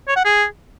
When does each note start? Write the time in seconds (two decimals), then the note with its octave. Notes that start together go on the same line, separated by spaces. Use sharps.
0.08 C#5
0.17 F#5
0.25 G#4